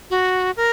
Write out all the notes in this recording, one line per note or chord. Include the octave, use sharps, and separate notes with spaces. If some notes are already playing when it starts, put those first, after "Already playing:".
F#4
A#4